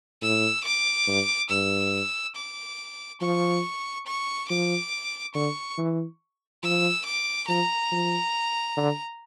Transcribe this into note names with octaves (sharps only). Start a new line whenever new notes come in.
A2 E6
D6
G2
G2 E6
D6
F3 C#6
C#6
F3 D6
D3 C#6
E3
F3 E6
D6
F3 A#5
F3
D3